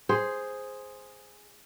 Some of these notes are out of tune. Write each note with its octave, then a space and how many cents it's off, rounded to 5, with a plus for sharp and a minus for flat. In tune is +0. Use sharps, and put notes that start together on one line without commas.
G#4 +0 C5 +0